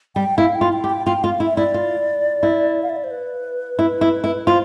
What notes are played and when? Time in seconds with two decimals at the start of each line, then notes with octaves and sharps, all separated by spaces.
0.16 G3 G5
0.38 E4 F5
0.55 G5
0.61 F4
0.73 G5
0.84 G4
0.90 G5
1.06 F4 G5
1.24 F4 F5
1.40 E4 E5
1.57 E4 D5
1.74 F4
2.43 E4
2.83 F5
2.89 E5
2.96 D5
3.04 C5
3.11 B4
3.79 E4
4.01 E4
4.24 E4
4.46 F4 C5